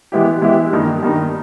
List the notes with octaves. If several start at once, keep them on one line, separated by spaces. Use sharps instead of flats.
E3 G#3 B3 E4 G4
E3 G#3 B3 E4 G4
G2 D#3 A#3 D#4
G2 D#3 A#3 D#4